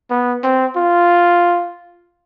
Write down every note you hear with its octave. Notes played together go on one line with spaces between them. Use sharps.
B3
C4
F4